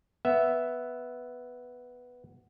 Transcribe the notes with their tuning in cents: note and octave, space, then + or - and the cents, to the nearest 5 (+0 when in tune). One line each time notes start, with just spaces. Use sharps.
B3 +0 E5 +0